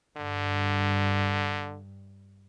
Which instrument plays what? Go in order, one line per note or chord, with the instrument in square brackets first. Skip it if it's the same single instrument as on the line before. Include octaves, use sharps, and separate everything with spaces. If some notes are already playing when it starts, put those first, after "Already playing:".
[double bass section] G2 [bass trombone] D3